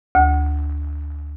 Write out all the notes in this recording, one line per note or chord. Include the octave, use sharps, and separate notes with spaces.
D2